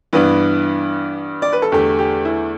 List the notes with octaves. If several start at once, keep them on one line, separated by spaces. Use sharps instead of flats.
G2 E3 B3 D4 B4
D5
B4
A4
E2 D3 A3 G4
G4
E4